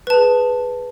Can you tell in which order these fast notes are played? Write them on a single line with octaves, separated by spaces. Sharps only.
B4 A5 G#4